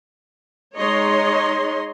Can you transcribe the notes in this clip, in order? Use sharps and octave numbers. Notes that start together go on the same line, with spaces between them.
G#3 D#4 C#5 D#5 C6